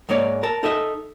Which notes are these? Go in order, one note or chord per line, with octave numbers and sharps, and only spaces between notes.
G#2 G#3 A#3 C#5 D5
A#4 A5
D#4 A4 D#5 E5